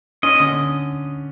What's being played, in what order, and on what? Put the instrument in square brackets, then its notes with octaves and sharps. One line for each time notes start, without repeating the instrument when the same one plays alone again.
[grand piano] C#4 [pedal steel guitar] D#5
[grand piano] D3